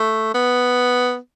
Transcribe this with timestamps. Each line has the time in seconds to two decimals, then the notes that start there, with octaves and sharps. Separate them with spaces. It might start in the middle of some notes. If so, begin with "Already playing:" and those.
Already playing: A3
0.34 B3